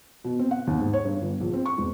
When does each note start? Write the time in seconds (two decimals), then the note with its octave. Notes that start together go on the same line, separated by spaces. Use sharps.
0.24 B2
0.39 C4
0.51 F#5
0.67 D#2
0.80 G#2
0.93 C#5
1.05 G2
1.22 G1
1.40 A#1
1.53 C4
1.66 C#6
1.78 E1